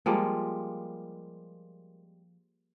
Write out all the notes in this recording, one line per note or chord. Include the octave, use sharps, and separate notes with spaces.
F3 G3 G#3 A#3